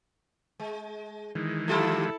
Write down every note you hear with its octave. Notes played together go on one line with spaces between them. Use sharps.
G#3
D#3 E3 G#3
F3 E4 F4 G4 A4